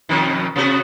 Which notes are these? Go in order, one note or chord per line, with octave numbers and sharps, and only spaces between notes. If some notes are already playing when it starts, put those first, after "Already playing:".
F2 B2 D#3
C3 B3 F#4